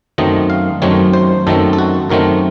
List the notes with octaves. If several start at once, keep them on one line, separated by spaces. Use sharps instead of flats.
F#2 D#3 F#3 A3 C4 D#5
F5
F#2 D#3 F#3 A3 C4 C#5
C5
F#2 D#3 F#3 A3 C4 A4
A4
F#4
F#2 D#3 F#3 A3 C4 A#4